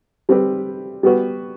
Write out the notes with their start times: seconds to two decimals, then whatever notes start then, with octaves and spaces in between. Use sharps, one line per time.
0.29 G3 C4 G4 B4
1.03 G3 B3 F#4 B4